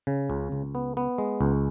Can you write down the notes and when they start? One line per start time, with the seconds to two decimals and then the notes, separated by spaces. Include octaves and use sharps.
0.07 C#3
0.30 C#2
0.52 C#2
0.75 B3
0.97 B3
1.18 G#3
1.41 C#2